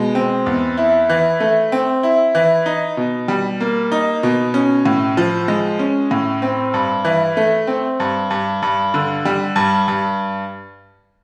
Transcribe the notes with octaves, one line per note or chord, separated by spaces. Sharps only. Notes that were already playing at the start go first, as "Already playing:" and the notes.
Already playing: B2 G#3
C4
E2
E4
E3
A3
C4
E4
E3
D#4
B2
G3
A#3
D#4
B2
C#4
A2
F3
G#3
C#4
A2
C4
G2
E3
A3
C4
G2
G2
G2
D3
G3
G2
G2